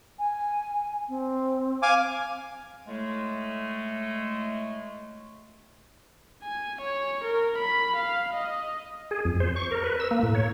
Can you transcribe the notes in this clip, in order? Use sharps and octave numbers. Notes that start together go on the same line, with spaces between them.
G#5
C4
F5 G#5 D6
A2 G#3 A3
G#5
C#5
A#4
B5
F5
D#5
G#4
F2
C5
C#6
A#4
B4
E6
A#3
A2
C#5